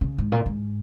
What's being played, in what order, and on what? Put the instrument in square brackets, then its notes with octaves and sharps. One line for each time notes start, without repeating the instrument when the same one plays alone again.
[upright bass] C#3
G#2
A#2
G#2